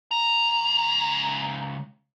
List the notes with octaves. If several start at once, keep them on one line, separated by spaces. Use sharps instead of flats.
C#2 A#5